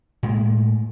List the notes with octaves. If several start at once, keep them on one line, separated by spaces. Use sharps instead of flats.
A2 G#3 A#3